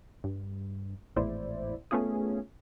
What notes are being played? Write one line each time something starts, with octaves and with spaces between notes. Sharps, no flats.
G2
G#1 E2 A2 E4 C5 D5
A3 B3 C#4 F4 G#4